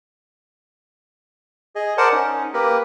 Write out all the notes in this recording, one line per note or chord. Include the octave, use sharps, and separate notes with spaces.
G#4 D#5
A#4 C5 D5 F#5 A5
C#4 D#4
A#3 G4 A#4 B4